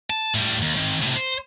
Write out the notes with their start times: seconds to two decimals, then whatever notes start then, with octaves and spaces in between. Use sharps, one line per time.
0.10 A5
0.35 A2 G3
0.62 D#2
0.76 D#3 C4
1.02 A2 C3
1.16 C5